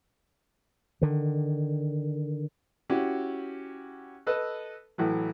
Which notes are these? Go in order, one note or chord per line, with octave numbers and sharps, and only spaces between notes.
D3 D#3
C#4 E4 F#4 G4
A4 B4 D#5 E6
A2 E3 F#3